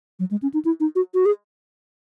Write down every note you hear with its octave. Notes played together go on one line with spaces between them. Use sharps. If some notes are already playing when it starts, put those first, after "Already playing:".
F#3
G#3
C#4
D#4
E4
D#4
F#4
F#4
G#4